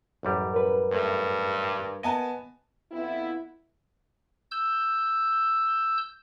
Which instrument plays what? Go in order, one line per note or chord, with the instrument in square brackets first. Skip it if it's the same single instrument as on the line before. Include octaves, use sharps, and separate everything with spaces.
[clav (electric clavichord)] A1 F#2 G3
[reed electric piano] A#4 B4
[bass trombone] G2 [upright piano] A3
[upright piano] B3 G#5 A5 [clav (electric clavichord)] D#5
[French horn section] F2 B3 E4
[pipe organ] E6 G6